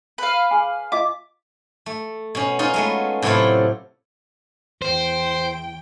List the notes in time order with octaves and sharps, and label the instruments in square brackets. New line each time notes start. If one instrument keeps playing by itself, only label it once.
[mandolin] B4 F5
[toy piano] G#4 G#5
[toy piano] F4 D#5 F5 [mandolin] D6
[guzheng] A3
B2 C#4
C#4 D#4 F4
G#3 A3 B3
A2 C3 F#3 E4 F4 A4
[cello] E2 G5 [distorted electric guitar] C5